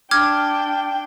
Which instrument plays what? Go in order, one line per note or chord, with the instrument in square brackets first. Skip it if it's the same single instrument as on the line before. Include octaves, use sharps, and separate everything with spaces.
[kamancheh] D4 G5 [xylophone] D6 F6 G#6